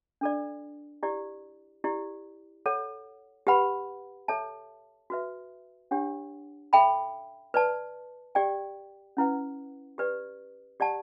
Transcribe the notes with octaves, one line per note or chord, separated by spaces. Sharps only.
D4 A4 D5
E4 G4 D5
E4 G4 D5
A4 C#5 F#5
G4 B4 F#5 B5
A4 C#5 E5 A5
F#4 B4 E5
D4 G4 C#5 F#5
A4 E5 G5 B5
B4 D5 A5
G4 D5 G5
C#4 E4 B4 F#5
G4 B4 D5
G4 D5 F#5 A5